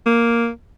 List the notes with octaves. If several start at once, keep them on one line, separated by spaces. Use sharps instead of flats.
A#3